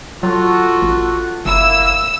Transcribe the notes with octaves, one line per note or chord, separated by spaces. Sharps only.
F#3 F4 F#4 A4
A1
F#1 A#3 E4 E6